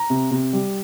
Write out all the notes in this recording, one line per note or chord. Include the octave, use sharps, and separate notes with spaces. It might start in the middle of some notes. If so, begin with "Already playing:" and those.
Already playing: A#5
C3
C3
G3